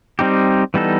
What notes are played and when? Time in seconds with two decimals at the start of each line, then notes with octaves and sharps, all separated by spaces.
0.19 G3 C4 D#4 G4
0.74 E3 G3 B3 D#4 A4